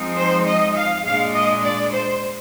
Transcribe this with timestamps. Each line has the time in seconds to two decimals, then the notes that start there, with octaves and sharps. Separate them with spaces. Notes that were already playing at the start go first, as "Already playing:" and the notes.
Already playing: F3 G#3 C4 D#4
0.16 C5
0.46 D#5
0.75 F5
1.05 A#2 G#3 D4 F5
1.34 D#5
1.63 D5
1.92 C5